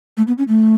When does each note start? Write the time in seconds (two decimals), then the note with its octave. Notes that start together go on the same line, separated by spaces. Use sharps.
0.17 A3
0.27 B3
0.38 C#4
0.48 A3